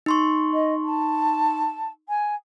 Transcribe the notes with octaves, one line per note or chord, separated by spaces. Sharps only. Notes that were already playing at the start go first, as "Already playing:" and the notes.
D#4 C6 C#6
D#5
A5
G#5